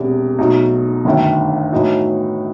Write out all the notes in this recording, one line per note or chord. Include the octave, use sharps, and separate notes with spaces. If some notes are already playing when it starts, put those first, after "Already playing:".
Already playing: E1 E2 C3
B1 B2 A3 D#4
G1 F#2 D#3 A3
A2 E3 A3 D#4 F#4